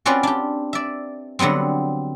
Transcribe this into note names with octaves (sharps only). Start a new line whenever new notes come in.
C4 C#4 F4 F#4 B4 D5
D4 G4
D5 E5
D3 F#3 G3 B3 C4